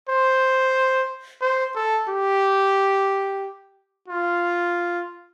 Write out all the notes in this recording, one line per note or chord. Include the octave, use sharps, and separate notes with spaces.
C5
C5
A4
G4
F4